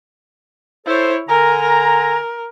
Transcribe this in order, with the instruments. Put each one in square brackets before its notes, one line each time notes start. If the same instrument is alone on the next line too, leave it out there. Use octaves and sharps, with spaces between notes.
[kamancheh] E4 C#5 [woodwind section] A4 C5
[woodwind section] D3 G#5 A#5 [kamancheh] A#4
[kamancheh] A#4